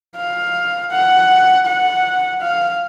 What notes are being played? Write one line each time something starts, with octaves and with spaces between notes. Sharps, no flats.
F5
F#5
F#5
F5